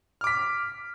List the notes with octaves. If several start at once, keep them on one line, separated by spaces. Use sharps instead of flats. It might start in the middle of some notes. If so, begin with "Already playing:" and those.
D6 F6 B6